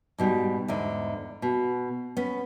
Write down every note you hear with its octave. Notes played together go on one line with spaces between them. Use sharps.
G#2 B2 G3
E2 G#2 D3
B2
B3 C#4